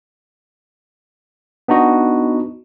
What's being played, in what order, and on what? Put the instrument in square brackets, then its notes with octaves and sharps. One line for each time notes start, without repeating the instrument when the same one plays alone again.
[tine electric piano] B3 D4 D#4 F#4 D#5